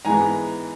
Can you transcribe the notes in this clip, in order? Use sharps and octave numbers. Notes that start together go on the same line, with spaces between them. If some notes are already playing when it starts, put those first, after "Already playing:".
G#2 E3 G#3 B3 G#5 A#5